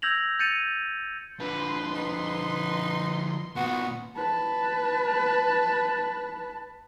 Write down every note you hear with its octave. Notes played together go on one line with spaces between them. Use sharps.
E6 G6 G#6 A#6 F7 F#7
G6 A6 C#7 D#7 F7
D3 F3 B4 C6
D#4 B4
A#2 D#3 B3 F#4
B4 A5